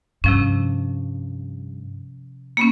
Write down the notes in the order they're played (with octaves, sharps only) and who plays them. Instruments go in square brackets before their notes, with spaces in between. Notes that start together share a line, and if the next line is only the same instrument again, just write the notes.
[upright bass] G2 [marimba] C3 F3 C#4
[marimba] A#3 B3 C#4